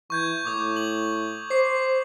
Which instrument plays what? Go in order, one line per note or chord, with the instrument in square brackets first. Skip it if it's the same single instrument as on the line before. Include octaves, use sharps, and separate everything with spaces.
[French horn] E3 [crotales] C#6 G6 G#6
[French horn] A2 [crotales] D6 D#6 G6
[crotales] F#7
[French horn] C5 [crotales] D6 C7